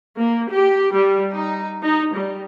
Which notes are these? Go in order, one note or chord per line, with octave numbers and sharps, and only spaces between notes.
A#3
G4
G3
D#4
D#4
G3